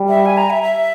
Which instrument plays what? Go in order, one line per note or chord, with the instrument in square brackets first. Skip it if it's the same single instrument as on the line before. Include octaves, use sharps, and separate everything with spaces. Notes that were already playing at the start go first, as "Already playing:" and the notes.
Already playing: [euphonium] G3
[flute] E5
G#5
A#5
E5
E5